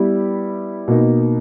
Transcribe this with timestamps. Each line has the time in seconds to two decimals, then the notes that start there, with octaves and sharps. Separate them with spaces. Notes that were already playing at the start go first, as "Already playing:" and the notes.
Already playing: G3 B3 E4 G4
0.88 B2 A#3 D#4